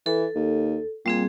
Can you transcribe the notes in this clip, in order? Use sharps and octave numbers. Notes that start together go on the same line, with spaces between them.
E3 A4
D#2
A#2 G3 C4 G#4